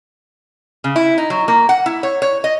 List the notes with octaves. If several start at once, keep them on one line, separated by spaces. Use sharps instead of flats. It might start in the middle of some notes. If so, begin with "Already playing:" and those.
C#3
E4
D#4
F#3
A#3
F#5
E4
C#5
C#5
D#5